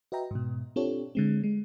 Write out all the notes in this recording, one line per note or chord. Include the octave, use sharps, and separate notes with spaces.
F#4 B4 D#5 E5 G5 A#5
G#2 B2
C4 D4 F4 G4 A4 C#5
D3 G#3 C4
G#3